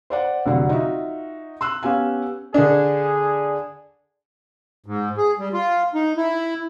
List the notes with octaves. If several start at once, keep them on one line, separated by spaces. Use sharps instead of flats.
C5 D5 F#5
F1 D3 F#3 F#5
D#4 F4 F#4 E5
C6 E6 F#6
B3 C#4 G4 F5 G#5
D3 D4 G#4
G#2
G#4
G3
F4
D#4
E4